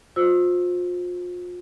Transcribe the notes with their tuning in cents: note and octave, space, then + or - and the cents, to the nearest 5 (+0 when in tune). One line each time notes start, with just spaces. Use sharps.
F4 +35 C5 -5 E6 +0